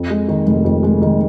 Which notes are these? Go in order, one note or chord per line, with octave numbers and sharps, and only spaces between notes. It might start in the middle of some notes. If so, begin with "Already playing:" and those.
Already playing: F2
G#3
D#3
F1
F2
G#3
D#3